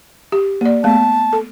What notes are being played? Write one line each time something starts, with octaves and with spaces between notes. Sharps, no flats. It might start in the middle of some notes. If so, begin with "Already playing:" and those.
G4
A#3 D5
A3 B3 A5
A4